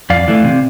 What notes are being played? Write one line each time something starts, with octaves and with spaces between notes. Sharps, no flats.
F2 D5 F5
E3 A3
C3